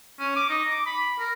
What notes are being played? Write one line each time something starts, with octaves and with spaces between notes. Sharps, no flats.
C#4
D6
D#4
D6
B5
A#4